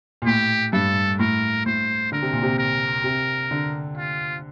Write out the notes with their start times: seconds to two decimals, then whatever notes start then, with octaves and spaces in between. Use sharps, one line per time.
0.22 A#2
0.26 A2 G4
0.73 G2 A4
1.19 A2 A#4
1.66 A2 C5
2.12 D3 A#4
2.22 C3
2.33 A#2
2.43 C3
2.59 A#4
3.04 C3
3.51 D3
3.97 F4